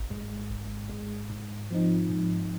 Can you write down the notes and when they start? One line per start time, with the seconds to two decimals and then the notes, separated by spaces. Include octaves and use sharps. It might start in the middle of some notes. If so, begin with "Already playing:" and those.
Already playing: G#1
0.10 G#2 G#3
0.50 G#1
0.89 G#2 G#3
1.30 G#2
1.70 F3 C4 D#4
2.09 G#2